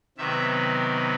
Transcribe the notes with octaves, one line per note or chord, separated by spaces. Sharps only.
C3 D#3 F#3 B3 E5